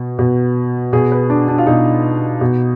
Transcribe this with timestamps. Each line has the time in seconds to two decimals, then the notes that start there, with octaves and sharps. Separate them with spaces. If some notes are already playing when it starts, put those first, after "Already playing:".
Already playing: B2
0.19 B2
0.93 B2 G#4
1.12 B4
1.30 D4
1.48 D4
1.58 F4
1.66 B2 D#4
2.41 B2